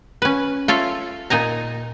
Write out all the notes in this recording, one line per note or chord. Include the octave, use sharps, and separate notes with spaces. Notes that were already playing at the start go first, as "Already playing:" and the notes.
C#4 B4
F4 A4 C#5 E5
A#2 D#4 G#5 A#5